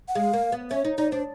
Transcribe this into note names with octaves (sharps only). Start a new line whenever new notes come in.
F#5
G#3 F5
A#3
B3
C#4 E5
D#4
D#4 D5
D4 C5